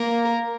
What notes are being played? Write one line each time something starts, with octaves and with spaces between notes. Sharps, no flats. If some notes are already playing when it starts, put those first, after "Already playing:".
Already playing: A#3 A#4